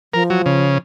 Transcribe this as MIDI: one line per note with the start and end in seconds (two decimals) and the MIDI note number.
0.14 0.77 53
0.14 0.23 70
0.30 0.42 54
0.46 0.78 49